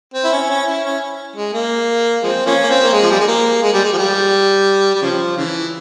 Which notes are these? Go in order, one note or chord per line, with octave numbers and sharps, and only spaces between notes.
C4
E4
C#4
C#4
E4
C#4
G#3
A#3
F3 G#3 C4
F3 A#3 C#4
A#3
C4
A#3
G#3
F3
G3
G#3
A#3
G#3
G3
G#3
F3
G3
G3
C#3 F3
C#3 E3